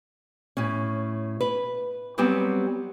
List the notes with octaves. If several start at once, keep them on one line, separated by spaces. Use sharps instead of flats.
A2 C#4
B4
F#3 G3 B3 C4 G4